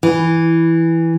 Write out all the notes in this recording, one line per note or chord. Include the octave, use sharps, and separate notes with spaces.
E3